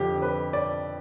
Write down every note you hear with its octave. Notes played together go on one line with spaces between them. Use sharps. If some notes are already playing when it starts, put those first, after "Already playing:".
Already playing: F2 D3 F3 G4
B4
D5